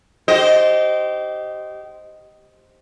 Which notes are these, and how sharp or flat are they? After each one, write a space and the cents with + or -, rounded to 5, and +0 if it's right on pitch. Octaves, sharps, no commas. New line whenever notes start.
G4 -25 C5 +0 D#5 +0